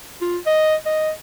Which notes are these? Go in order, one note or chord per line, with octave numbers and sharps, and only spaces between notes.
F4
D#5
D#5